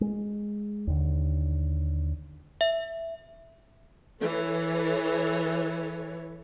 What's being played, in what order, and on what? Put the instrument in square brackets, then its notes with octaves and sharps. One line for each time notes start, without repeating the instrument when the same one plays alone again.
[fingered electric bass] G#3
D#2 D3
[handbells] E5
[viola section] E3 A4 C#5